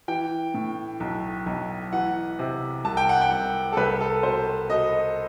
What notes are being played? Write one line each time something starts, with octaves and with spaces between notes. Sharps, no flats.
E3 G5
A2
B1
B1
E3 F#5
C3
C2 A5
G5
F#5
G5
C2
A4
C2 B4
A4
B2 C5
B2 D#5